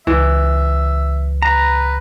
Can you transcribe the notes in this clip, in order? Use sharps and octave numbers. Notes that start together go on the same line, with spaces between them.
C#2 E3 E5
B4 A#5